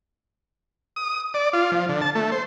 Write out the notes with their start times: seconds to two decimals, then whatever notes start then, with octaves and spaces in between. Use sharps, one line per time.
0.96 D#6
1.34 D5
1.53 F4
1.72 F3
1.89 D3
2.02 A5
2.15 A3
2.32 C5